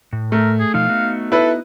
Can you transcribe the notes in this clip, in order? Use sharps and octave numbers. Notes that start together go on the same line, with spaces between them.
A2
A3 A#4
G#4
B2 F3 D#4 F5
B3 D#4 F#4
E4 A4 B4